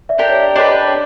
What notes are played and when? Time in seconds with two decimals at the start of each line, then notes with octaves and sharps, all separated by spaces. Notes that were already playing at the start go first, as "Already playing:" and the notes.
0.09 D5 E5
0.18 D4 G4 A#4
0.30 C#5
0.42 D5
0.55 D4 G4 B4 C#5 D#5
0.75 D5
0.85 C#5